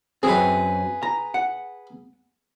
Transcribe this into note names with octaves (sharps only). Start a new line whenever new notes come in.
F#2 F#3 C4 G#4 B4
A#5
F#5